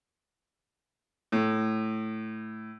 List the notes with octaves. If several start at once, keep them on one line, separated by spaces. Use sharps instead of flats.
A2